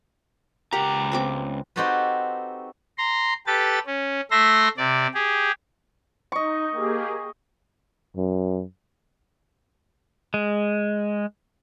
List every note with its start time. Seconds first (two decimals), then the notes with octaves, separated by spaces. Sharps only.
0.73 C#2 G4 A#4 F#5 A#5
1.12 B3 C4 D6
1.76 C4 D#4 F#4 G4 A4 B4
2.98 A#5 C6
3.47 G4 A4 B4 A6
3.86 C#4
4.31 A3 E5 C6 A#6
4.78 C3 D5
5.14 G4 G#4
6.32 D#4 D#5 C#6
6.72 A#3 G4 G#4
8.17 F#2
10.34 G#3